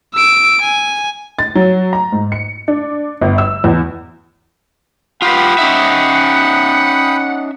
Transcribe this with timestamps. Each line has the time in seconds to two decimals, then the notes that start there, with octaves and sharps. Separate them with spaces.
0.14 E6 D7
0.61 G#5
1.39 A6
1.55 F#3
1.93 A#5
2.12 G#2
2.32 C#7
2.68 D4
3.21 G1
3.38 E6
3.64 E2
5.22 F4 G4 B4 F#5 G5 B5 D#6
5.58 C#4 D#4 E5